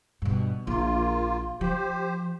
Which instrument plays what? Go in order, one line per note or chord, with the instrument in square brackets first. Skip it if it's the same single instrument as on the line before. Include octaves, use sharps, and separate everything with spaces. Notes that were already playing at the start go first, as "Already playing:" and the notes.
[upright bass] G2 B2
[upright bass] A#1 [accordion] A#3 F4
[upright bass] F3 [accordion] G4 C5